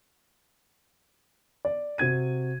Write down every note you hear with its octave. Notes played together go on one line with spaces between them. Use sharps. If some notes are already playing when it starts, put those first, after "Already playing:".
D5
C3 F#4 G#6 D#7